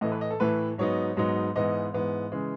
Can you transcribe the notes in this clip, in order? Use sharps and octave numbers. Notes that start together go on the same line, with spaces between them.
A2 E3 A3 D#5
B4
D#5
A4
A2 E3 A3 B4
G#2 F#3 B3 D#4 C#5
G#2 F#3 B3 D#4
G#2 E3 B3 D#5
G#2 E3 B3
C#3 E3 G#3